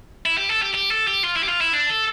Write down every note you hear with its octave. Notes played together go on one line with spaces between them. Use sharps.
E4
G4
A4
G4
G4
A4
G4
F4
E4
G4
F4
E4
D4
A4